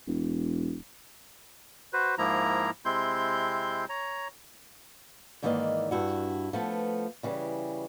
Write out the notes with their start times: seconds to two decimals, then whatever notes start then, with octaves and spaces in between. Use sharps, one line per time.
0.07 E1
1.93 F#4 B4 C5
2.18 G#2 F3 A#3 E4 A#5
2.85 C3 G#3 C4 E4 C6 G6
3.89 C#5 A#5
5.42 G#2 D#3 E3 A#3 D5 D#5
5.91 G2 E4 F#4
6.53 F3 A3 B3
7.23 C#3 E3 G3